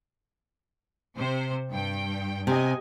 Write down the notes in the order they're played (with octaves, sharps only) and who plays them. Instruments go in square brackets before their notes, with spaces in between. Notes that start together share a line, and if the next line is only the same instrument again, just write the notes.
[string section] C3 C5
G2 G5
[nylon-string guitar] C3 [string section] D#5 G#5